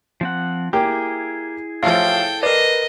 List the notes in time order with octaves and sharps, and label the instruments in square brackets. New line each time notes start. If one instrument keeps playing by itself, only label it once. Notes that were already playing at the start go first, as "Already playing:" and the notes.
[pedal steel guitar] F3 C4 F#5
[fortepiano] A#3 G4 G5 [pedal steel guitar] E4 G#4
[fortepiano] A1 A2 F3 [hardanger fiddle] A4 G5 [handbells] F5
[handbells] A#4 B4 [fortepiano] D5 [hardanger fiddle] D#5